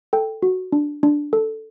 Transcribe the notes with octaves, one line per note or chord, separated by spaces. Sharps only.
A4 G5
F#4
D4
D4
A4